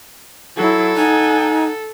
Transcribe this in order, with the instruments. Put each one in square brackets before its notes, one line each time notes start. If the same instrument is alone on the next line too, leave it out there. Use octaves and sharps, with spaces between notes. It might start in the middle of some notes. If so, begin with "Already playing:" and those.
[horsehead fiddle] F#3 E4 [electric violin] A4
[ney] D#4 [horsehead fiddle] F#5 G#5